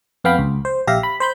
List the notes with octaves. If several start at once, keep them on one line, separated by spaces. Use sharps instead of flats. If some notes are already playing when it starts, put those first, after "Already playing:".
F2 B3 F5 G5 B5
C#2
C5
A#1 G4 E5 F5 A#6
B5
C5 B5 G6